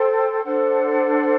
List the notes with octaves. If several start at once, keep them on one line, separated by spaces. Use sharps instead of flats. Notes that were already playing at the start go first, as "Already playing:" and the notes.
Already playing: A4 C5 G5
D4 A4 C5 F#5